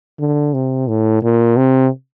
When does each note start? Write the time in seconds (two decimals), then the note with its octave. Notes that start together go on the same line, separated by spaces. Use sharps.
0.20 D3
0.54 C3
0.88 A2
1.23 A#2
1.57 C3